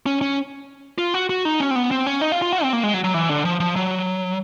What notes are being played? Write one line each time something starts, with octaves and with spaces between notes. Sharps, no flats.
C#4
C#4
F4
F#4
F#4
D#4
C#4
C4
B3
C4
C#4
D#4
F4
F4
F#4
C4
A#3
G#3
F#3
F#3
E3
D3
F3
F3
F#3